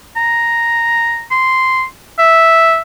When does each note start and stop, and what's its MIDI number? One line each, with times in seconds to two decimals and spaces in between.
0.16 1.23 82
1.31 1.84 84
2.19 2.80 76